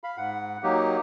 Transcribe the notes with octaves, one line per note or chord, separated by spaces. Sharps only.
F5 B5
G#2 F#5
F#3 A#3 D#4 G4